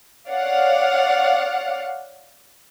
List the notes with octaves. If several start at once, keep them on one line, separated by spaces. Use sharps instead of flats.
C#5 D5 F5 F#5